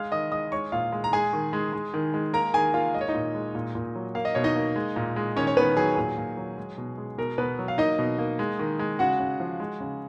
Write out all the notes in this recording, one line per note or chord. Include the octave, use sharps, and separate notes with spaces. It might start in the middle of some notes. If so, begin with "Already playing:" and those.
Already playing: G#3 F5 F6
D#3 D#5 D#6
G#3 D#5 D#6
G#3 C#5 C#6
A#2 F4 F5
G#3
A#5
G#3 G#4 G#5
D#3
G#3
G#3
D#3
G#3
A#3 A#4 A#5
D#3 G#4 G#5
A#3 F4 F5
G#3 D#5
C#5
D#4 D#5
A#2
G#3
A#2
A#2
F#3
A#3 F5
D#5
B2 C#5
D#4 D#5
A#3
G#3
A#2
G#3
D#3 C#4 C#5
C#5
D#3 B3 B4
F#3 G#4
A#2 G#4
A#2
F#3
G#3
B2
G#3
B2 A#4
B2 B3 B4
F#3
F5
A#3 D#4 D#5
B2
A#3
G#3
D#3
G#3
C#3 F#4 F#5
C#3
F3
G#3
C#3